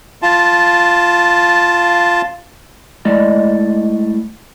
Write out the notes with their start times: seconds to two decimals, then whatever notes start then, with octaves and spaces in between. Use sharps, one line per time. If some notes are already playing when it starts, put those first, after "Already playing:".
0.22 F4 A5
3.05 A2 G#3 D5 D#5